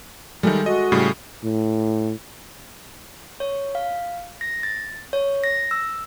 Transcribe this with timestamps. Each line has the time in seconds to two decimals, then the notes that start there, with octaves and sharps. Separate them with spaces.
0.43 D#3 G3 G#3 A4 E5
0.66 F#4 D#5
0.92 A2 C#3 G3
1.44 A2
3.40 C#5
3.75 F5
4.41 A#6
4.63 A6
5.13 C#5
5.44 A#6
5.71 E6